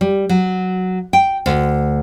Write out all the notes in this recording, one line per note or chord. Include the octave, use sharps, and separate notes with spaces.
G3
F#3
G5
D2